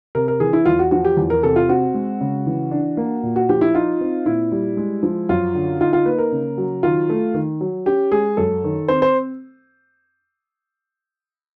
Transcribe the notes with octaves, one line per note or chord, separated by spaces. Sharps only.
C3 A#4
A#4
E3 G#4
E4
E2 F4
F#4
F3 F#4
G4
E2
A#4
C3 A4
F4
C4 F#4
G#3
C#3
E3
D4
A#3
A#2
F#4
F3 G4
E4
D#4 F4
C4
A#2 E4
G3
G#3
F3
F#2 F4
D3
D#4 F4
F4
A#3 B4
A#4
C#3
F#3
D#3 F4
A3
D#3
F#3
C#4 G4
G#3 G#4
F#2 A4
D#3
C4 C5
C5